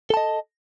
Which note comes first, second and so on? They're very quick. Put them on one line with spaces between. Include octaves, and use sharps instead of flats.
A4 A5 D#5